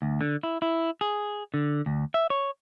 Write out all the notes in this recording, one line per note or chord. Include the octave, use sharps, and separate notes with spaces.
D2
D3
E4
E4
G#4
D3
D2
E5
C#5